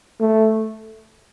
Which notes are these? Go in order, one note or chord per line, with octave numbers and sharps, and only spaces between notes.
A3